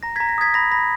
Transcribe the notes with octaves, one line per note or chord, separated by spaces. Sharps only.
A#5 A#6
A#5 G#6 B6
A#6
D#6 G#6 B6
B5 A#6
B5 A#6